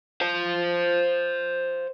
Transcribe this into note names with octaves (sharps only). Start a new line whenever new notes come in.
C5 F5